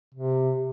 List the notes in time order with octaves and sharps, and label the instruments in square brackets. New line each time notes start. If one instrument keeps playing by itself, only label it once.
[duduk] C3